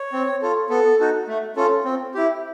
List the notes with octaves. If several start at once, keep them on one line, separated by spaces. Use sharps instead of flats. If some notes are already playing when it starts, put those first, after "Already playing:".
Already playing: C#5
C4
F4 A4
B3 A4
D#4 F#4 A4
A3
C#4 F4 A4
C4
E4 G4